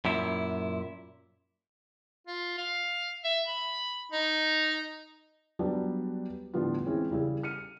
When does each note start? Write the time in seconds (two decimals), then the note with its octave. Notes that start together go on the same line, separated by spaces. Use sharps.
0.05 F#2 A#2 E4
2.27 F4
2.58 F5
3.25 E5
3.48 B5
4.12 D#4
5.59 F#3 G3 B3 D4
6.54 A2 D3 F3 G3 B3 F4
6.86 E3 G#3 C4 C#4
7.11 C#3 G3 E4 G#4
7.43 F6 C#7 D#7